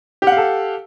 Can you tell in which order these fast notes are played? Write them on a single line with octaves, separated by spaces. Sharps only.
G4 F#5 F5 A4